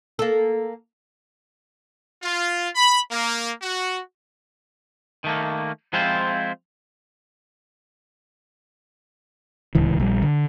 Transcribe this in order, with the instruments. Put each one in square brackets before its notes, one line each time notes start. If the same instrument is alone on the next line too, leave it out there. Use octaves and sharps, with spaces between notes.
[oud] A#3 A4
[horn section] F4
B5
A#3
F#4
[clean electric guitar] D#3 A3 A#3
F3 G#3 C4 E4 F4 C5
[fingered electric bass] D1 C#2 E3
A#1 G3
D3